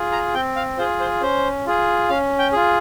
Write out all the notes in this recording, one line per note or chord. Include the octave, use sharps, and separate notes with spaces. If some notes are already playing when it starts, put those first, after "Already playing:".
Already playing: F4 G#4
A#5
C4 G5
F5
F4 G#4 C5
C5
C#4 C5
F4 G#4
C#4 F5
G5
F4 G#4